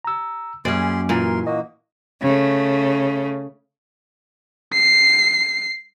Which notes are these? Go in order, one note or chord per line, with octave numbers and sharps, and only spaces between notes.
A#5 E6
F#2 G3 A#3 C#4 G#4 D5 C6
A#2 E3 A#4 C6
A#3 F#4 D#5
C#3 A3
C7